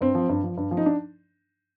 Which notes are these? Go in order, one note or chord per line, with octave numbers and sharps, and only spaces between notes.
G2 C4
F3
G2
F3
G2
F3
D#4
D4